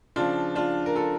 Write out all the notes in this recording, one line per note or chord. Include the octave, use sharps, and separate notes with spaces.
C#3 F3 D4 F4
D4 F4
A#4
F4 A4